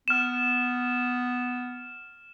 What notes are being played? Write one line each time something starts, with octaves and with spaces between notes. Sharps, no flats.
B3 F6 E7